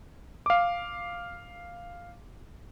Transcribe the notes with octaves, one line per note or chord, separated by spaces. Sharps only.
F5 D6